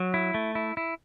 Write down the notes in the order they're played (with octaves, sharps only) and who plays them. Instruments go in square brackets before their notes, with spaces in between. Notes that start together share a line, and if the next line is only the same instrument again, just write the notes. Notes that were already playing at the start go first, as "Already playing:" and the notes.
Already playing: [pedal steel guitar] F#3
E4
A3
E4
E4